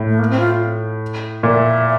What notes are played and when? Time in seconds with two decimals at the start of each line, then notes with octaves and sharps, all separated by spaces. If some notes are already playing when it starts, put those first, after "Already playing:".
Already playing: A2
0.09 A3
0.19 A#3
0.30 C4
0.39 F4
1.43 A#2 E5